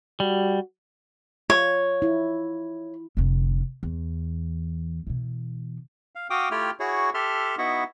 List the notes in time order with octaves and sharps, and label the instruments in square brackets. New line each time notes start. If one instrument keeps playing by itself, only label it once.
[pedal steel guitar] G3 [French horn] F#4
[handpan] F4 [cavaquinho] C#5
[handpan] E4
[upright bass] F1 D3
E2
B2 E3
[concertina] F5
F#4 F5 G5 D6 D#6
A3 E4 F4 G4 G5 F6
E4 F#4 G#4 C#5
G4 A4 E5 A5 C6 F6
B3 D#4 E4 F#4 E5 F#5